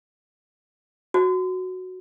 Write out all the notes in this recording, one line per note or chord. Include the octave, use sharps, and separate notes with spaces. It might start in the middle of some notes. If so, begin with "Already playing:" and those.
F#4